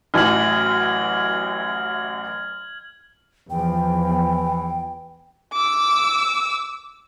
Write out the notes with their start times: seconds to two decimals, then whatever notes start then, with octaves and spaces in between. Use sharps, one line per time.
0.14 A1 F#2 E3 F6 G#6 F#7
3.50 E2 E3 F3 G5
5.53 D6 E6